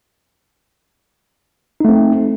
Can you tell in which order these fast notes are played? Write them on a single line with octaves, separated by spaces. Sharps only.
D#4 A3 C4